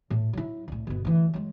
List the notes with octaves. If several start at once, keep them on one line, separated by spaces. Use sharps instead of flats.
A2
F#3 E4
C2 A2
G1 B2
D2 E3
F#3 G#3